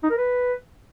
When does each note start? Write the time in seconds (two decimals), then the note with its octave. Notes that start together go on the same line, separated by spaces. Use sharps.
0.03 D#4
0.11 A#4
0.18 B4